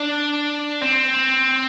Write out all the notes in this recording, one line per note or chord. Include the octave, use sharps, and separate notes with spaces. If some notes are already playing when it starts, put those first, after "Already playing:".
Already playing: D4
C4